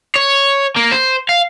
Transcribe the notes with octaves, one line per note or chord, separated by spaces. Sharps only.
C#5
A#3
C5
F5